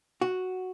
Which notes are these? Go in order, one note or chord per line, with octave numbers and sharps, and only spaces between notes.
F#4